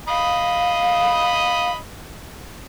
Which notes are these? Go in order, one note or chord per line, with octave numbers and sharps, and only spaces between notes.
D#5 F5 B5